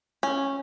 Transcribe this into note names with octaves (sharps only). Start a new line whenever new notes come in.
C#4